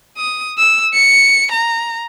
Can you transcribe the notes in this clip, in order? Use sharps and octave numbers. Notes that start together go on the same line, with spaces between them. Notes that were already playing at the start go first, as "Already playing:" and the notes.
D#6
E6
C#7
A#5